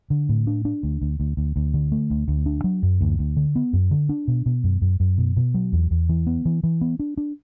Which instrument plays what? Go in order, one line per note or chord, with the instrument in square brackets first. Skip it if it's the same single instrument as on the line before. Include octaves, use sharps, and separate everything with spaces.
[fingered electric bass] D3
A2
D4
D4
D2
D2
D2
D2
D2
D3
A3
D2
D2
D4
F#3
F#2
D2
D2
D3
B3
F#2
D3
D4
B2
B2
F#2
F#2
F#2
B2
B2
F#3
E2
E2
E3
B3
E3
E3
B3
D4
D4